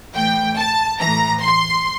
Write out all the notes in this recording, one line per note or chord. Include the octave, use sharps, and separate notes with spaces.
A2 E3 G5
A5
A2 E3 A#5
C6